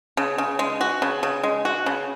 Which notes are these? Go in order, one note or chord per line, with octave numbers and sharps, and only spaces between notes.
C#3
C#3
G#3
F#4
C#3
C#3
G#3
F#4
C#3